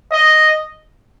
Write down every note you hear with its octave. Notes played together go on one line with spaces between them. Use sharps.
D#5